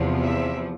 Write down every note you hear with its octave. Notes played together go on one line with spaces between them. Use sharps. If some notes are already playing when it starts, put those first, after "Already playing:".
Already playing: E2 C3 F3
E5